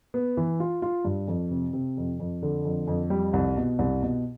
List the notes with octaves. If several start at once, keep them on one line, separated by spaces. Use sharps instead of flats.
B3
E3
F4
F4
G2
F2
C3
C3
F2
F2
D3
F2
F2
G3
C2
B2
C2
B2